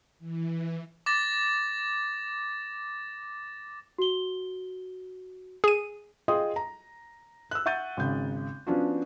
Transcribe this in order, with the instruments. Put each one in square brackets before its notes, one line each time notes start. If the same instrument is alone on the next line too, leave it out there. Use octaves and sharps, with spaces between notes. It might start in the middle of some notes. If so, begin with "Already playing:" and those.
[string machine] E3
[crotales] D6 A6 A#6
[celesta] F#4 G7
[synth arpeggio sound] G#4 D#7
[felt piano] F4 G#4 D#5 G5 C6 D#6
A#5
E6 F#6
E5 F#5 C#6 G6 A6 D#7
G#1 C#3 G6
F3 B3 C#4 D4 F4 F#4